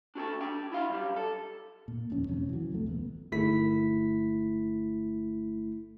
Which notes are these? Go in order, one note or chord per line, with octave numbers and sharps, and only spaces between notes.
D4 F#4 G#4 A4
D4 G5
E4 F#4 F5
F#2 G3
A4
A#2
D#1 F2 C4 C#4
A1 F2 C3 C#4
E3 F#3
C2 F2 A3
D#1 A1 G3 B3
G1 A3 E4 B6